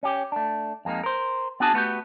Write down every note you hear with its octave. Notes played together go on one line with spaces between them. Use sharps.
C#4 G4
A3 D4
F2 G#3 A#3 D#4
A#4 C5
B3 D4 F#4 G#4 G#5 A5
A3 B3 F#4 G4